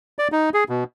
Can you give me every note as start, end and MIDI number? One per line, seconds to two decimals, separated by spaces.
0.19 0.28 74
0.32 0.50 63
0.54 0.64 68
0.69 0.84 47